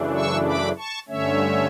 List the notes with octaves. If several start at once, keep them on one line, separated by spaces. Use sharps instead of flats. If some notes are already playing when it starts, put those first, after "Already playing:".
Already playing: F#2 C#3 E3 A3 D4
C#6 E6
B5 D6
A5 C#6
G2 D3 A3 C#4 C#5 E5